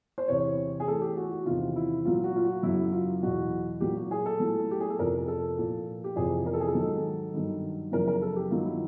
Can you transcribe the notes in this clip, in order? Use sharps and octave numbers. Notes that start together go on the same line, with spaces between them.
C5
E2 C3 E3 C#5
G#4
A2 E3 A4
G4
F#4
F#4
E2 C3 D#3 F4
E4
A#2 F#3 F4
F#4
F4
F#4
F#2 C#3 F#3 E4
F4
E2 B2 F#3 F#4
A#2 F#3 G4
F#4
G#4
A4
A2 F#3
G4
G#4
A4
F2 C3 F3 A#4
A4
A#2 F3
G4
F2 C3 E3 G#4
A#4
A4
G#4
A4
G#2 D#3 F#3
G2 D#3 F#3
F#2 C#3 F3 A#4
A#4
A4
G4
G2 D#3 F#3 F4
E4